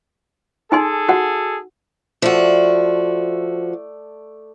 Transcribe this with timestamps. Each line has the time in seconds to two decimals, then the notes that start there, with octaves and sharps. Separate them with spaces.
0.72 D#4 G#4 A4 G#5 C6
1.09 F#4 F#5
2.22 F3 A3 F#4 D5